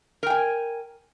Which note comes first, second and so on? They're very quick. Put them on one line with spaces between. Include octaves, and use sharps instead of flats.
A#4 G5 G#5